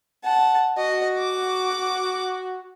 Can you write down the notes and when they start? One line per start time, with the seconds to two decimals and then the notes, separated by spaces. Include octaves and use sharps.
0.24 F#5 A5
0.77 F#4 D#5
1.18 D6